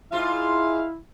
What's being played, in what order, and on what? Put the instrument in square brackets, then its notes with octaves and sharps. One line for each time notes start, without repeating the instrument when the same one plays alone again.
[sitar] G#2 F4 [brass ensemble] E4 [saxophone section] F5